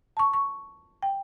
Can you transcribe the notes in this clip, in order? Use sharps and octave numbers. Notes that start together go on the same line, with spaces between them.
A5 C#6
C#6
G5